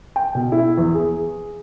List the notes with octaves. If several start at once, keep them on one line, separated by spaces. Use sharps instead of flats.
G5
B2
E4
E2
G#4